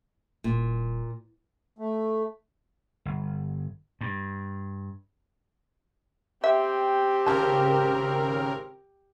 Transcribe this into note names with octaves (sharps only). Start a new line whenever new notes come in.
D#1 A#2
A3
G1
G2
C4 G4 E5
G#1 C#3 F3 A#4 A5